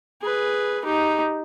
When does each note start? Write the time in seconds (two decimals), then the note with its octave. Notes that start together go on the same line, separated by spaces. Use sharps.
0.22 G#4 B4
0.85 D#4 G4